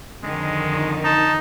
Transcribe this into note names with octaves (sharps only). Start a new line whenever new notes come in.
F2 D3 D#3 G#3
D#4 A5